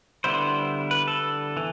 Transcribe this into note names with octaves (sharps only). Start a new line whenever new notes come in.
D3 G3 B3 E4 C5
B4
A4
E3